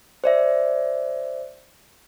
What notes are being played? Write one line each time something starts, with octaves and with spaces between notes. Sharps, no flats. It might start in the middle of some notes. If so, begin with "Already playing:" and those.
C5 D5 E5